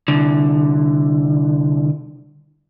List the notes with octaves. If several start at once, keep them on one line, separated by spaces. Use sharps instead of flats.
C2 D3